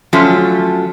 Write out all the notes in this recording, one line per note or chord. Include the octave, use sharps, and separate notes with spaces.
F3 F#3 A3 C#4 F4